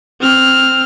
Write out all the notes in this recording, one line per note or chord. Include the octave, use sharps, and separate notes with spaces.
C4 F6